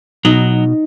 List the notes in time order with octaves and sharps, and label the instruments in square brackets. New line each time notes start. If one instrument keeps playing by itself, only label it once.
[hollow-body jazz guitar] B2 [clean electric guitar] F#3 [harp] D#4